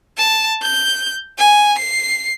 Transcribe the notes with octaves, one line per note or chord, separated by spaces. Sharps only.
A5
G6
G#5
C7